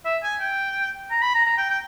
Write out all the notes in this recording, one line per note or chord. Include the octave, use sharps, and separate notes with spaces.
E5
G#5
G5
A#5
B5
A#5
A#5
G5
G5